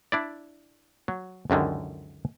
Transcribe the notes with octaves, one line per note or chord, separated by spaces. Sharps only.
D4 E4 D5
F#3
C#2 F#2 D3 D#3